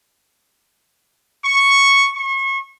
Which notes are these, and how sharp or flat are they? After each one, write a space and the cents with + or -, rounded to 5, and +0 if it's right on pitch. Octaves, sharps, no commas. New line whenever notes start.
C#6 +0
C#6 -35